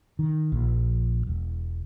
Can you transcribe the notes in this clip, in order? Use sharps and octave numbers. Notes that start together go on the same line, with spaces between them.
D#3
A#1
E1